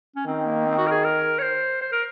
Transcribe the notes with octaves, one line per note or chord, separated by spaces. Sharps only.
C#4
D#3 C4
A#3
C4
F#4
A#4
G#4
A#4
C#5
C5
C5
A#4